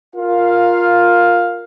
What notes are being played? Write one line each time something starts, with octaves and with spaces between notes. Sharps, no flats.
F4 A#4 F5